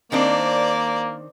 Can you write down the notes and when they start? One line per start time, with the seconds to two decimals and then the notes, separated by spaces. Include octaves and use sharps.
0.12 D#3 A#3 C4 D4 C5 D5